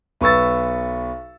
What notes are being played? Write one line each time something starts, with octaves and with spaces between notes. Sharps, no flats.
B1 B4 C#6 E6 A6